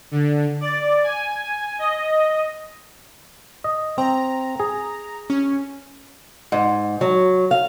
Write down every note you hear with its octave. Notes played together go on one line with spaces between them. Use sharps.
D3
D5
G#5
D#5
D#5
C4 A#5
G#4
C#4
G#2
F#3
F5